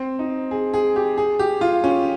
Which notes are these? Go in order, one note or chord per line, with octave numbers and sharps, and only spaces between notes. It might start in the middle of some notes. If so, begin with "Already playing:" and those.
Already playing: C4
D#4
G#4
G#4
G4
G#4
G4
F4
C#4